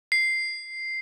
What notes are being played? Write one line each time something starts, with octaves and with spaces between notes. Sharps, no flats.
C7